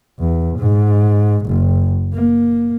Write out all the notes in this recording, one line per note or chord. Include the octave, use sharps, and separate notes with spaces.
E2
G#2
F#1
A#3